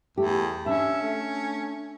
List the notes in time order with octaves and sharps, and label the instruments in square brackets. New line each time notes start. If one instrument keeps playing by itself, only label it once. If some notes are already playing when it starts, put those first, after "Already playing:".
[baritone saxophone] E2 [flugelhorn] A3 [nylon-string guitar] G4
[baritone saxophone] C#4 [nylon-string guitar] D4 A5 [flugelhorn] E5
[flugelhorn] A3